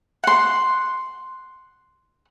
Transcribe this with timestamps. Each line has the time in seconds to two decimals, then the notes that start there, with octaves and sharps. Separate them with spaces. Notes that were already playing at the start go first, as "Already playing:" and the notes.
0.24 F#5 C6